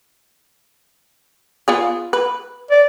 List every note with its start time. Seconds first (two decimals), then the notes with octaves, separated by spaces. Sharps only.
1.68 B3 F4 G#4
2.13 B4
2.71 D5